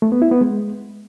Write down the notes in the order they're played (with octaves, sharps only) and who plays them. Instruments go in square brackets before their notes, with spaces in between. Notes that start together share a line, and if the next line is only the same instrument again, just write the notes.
[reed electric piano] A3
B3
E4
B3
G#3